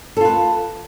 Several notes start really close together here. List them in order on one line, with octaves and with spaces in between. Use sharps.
A4 F4 B4